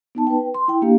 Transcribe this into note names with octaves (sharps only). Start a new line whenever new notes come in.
B3 D#4 A5
B4 G5
C6
E4 G5
A#3 D4 G4 F5